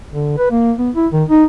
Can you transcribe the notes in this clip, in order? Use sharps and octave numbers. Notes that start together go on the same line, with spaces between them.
D3
B4
A#3
B3
E4
D#3
D#4